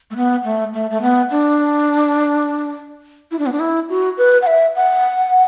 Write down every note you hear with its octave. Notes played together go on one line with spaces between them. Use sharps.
A3
B3
A3
A3
A3
B3
D4
E4
D4
B3
D4
E4
F#4
B4
F#5
E5
F#5